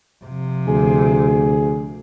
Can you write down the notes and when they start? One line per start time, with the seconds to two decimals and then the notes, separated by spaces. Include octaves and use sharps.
0.25 C3 F3
0.67 D2 G#4